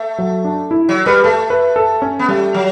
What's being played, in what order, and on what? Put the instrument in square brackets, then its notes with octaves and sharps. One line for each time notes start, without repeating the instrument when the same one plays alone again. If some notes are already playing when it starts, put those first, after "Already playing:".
Already playing: [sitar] A3
[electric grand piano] F#3
D4
E4
[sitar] F#3
[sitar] G3 [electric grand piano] B4
[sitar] A3 [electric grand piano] A4
[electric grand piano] B4
A4
C#4
[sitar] B3
[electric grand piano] G3 [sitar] A3
[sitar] F#3